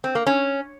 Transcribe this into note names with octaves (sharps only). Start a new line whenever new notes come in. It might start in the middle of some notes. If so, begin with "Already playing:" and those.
C4
A#3
C#4